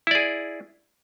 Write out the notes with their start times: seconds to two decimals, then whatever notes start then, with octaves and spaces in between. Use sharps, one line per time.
0.07 E4
0.11 D5
0.15 G#4